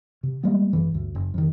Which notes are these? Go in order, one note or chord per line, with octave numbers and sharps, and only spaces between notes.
C3
G3 G#3 A#3 B3
G#1 F#2 E3
G1 D2
F#1
F2 D#3